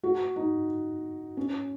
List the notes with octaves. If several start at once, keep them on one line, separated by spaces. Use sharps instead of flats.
F#4
D#4
C#4